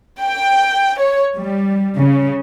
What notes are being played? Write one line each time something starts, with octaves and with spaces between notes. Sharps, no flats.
G5
C#5
G3
C#3